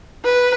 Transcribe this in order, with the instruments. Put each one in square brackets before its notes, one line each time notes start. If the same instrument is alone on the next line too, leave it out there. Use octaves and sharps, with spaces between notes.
[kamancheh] B4